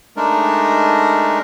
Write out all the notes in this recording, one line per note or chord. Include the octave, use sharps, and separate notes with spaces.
G#3 A3 D4 D#4 A#4